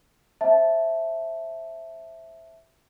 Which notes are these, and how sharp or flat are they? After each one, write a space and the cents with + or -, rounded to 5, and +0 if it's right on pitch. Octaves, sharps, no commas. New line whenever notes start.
C5 +25 E5 +0 A5 -10